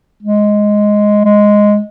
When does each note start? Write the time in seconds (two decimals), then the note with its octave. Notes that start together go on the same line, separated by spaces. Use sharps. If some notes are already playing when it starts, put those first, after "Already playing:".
0.23 G#3
1.25 G#3